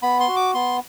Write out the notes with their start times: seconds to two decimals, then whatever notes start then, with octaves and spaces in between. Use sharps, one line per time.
0.03 B3 B5
0.20 C6
0.28 F#4
0.36 D6
0.54 B3 C6